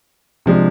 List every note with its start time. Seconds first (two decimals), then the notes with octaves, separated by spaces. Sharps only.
0.46 C3 F3 G#3 D4